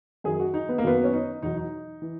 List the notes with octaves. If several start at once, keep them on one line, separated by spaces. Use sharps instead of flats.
F#2 D#3 F#3 G#4
F#4
D#4
B3
A#3
F#2 D#3 F#3 B3
C#4
D#4
E2 B2 F#3 D#4
D#4
E3